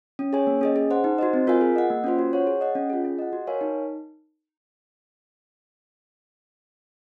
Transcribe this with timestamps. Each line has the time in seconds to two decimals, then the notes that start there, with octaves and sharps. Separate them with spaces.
0.19 C#4
0.33 G#4 C#5 G#5
0.47 A#3
0.61 C#4 G#4 D#5
0.76 G#4
0.91 C5 F#5
1.04 D#4
1.18 F#4 C5 D#5
1.34 C4
1.47 F4 A#4 F5 G#5
1.61 G#4
1.76 D#5 F#5
1.90 A#3
2.04 C#4 F4 C5
2.19 F#4
2.33 C#5 F#5
2.47 G#4
2.61 D#5 F#5
2.75 C#4
2.90 F4 G#4
3.05 G#4
3.19 D#5 F#5
3.33 F#4
3.47 A#4 C#5 F5 G#5
3.61 D#4